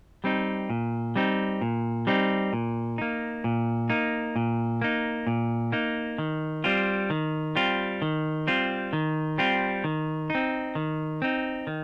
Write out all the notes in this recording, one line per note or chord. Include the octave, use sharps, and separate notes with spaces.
G3 C4 D#4
A#2
G3 C4 D#4
A#2
G3 C4 D#4
A#2
A#3 D#4
A#2
A#3 D#4
A#2
A#3 D#4
A#2
A#3 D#4
D#3
G3 C4 F4
D#3
G3 C4 F4
D#3
G3 C4 F4
D#3
G3 C4 F4
D#3
C4 D#4
D#3
C4 D#4
D#3